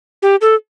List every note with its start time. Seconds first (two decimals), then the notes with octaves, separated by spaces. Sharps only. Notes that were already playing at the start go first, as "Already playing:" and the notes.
0.22 G4
0.41 A4